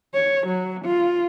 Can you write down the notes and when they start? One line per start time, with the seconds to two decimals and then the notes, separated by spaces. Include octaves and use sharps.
0.14 C#5
0.47 F#3
0.85 F4